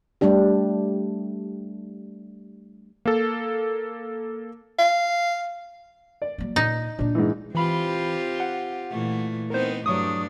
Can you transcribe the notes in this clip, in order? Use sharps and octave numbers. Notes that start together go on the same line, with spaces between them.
G3 A3 D4 G4
A#3 A4
F5
D5
F#3 A#3
A#2 D#4
A#2 D4 F4
G#2 E3
E3 C4 F4 G4 B5
F#5
A#2 E3 A3
B3 C4 D#4 A#4 C5
G2 F#3 A3 D4 C#6 D#6